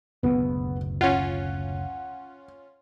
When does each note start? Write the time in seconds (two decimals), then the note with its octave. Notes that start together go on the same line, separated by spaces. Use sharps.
0.23 F#1 D2 B2 B3
1.01 C#4 F4 F#5